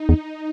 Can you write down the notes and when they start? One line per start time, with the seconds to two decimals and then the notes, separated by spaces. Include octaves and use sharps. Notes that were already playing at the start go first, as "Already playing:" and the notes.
Already playing: D#4
0.09 E2